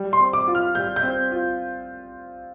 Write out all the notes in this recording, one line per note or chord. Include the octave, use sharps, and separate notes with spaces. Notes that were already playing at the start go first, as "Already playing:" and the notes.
Already playing: G3
C6
C4
D6
F4
F6
G3 G6
G6
C4
F4